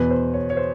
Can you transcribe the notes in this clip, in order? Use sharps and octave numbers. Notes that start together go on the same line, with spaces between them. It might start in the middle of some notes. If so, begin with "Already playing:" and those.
Already playing: E2 B2 B4
C5
C#5
C#5
C5